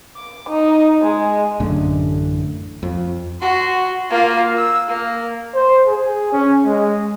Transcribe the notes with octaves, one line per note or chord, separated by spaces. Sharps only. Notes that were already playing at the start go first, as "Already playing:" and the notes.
D6
D#4
G#3
A1 F#2 A2 D3
F2
F#4 C6
A#3 F4
E6
A#3
C5
G#4
C#4
G#3